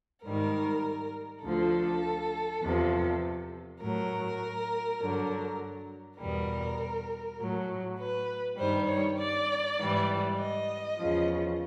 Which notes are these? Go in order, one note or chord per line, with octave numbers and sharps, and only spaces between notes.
G#2 D#3 G3 A#4
D2 D3 F3 A4
E2 C3 F3
A2 F#3 A#4
G2 D3 F#3
E2 B2 G3 A#4
A2 F#3
B4
G2 D#3 G3 C5
C#5
D5
G#2 E3 G3
D#5
E2 C#3 F3